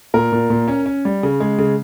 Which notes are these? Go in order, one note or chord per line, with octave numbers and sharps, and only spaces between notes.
A#2 A#4
A#2
A#2
C#4
C#4
G3
C#3
G#3
C#3